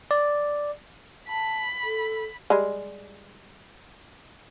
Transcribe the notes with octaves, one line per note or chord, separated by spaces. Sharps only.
D5
A5 B5
A4
G3 G#3